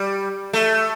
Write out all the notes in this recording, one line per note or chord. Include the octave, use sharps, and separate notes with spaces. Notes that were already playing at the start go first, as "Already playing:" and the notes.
Already playing: G3
A3